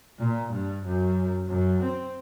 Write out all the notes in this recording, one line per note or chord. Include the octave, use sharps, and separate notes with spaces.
A#2
G2
F#2
F#2
C4